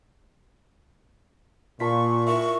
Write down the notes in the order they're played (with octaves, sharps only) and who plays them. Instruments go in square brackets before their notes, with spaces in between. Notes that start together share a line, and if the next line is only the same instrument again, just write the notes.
[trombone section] A#2 [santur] F4 A5 [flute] C#6 [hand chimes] B6
[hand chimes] E4 A#4 E5 [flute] C#6